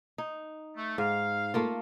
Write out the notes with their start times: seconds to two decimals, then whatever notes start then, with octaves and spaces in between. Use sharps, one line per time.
0.18 D#4
0.76 A3
0.98 G#2 F5
1.54 A3 A#3 F4